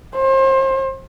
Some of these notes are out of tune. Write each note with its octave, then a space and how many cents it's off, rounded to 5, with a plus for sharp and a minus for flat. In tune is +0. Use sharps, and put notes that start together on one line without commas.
C5 +35